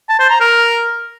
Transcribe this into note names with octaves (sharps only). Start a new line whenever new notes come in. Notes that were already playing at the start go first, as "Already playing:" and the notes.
A5
C5
A#5
A#4